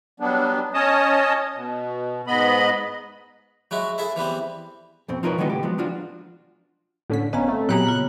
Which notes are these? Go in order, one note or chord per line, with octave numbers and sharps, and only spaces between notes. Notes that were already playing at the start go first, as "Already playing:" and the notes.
F#3 G3 B3 D4
C#4 C#5 D#5 A5 D#6
B2
G#2 B3 D#5 B5
F#3 G#3 E4 F#4
E4 G#4 A4 E5
E3 G3 B3 C4
F2 B2 C4
F3 D#4 F4 A#4 B4 C#5
D3 D#3 F#3 G#3 B3 D#4
C#2 A2 G4
F3 F#3 G#3 B3
F3 D4 F4 F#4
A2 D3 C#4 B6
G1 B3 C#4 B4 D#5 F5 A#5
A3 C4
A#2 F#3 B3 G4 G#4 C#5 A#5 F#6
C#3 A#3 F4